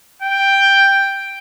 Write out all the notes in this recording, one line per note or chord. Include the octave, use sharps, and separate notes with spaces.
G5